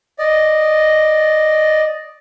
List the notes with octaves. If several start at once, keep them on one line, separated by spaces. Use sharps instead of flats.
D5 D#5